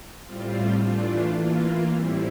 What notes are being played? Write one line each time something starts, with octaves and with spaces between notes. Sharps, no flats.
A2 G3 C4 F4
E3 A3 D4 F4
E3 A#3 F4
A2 G3 C4 E4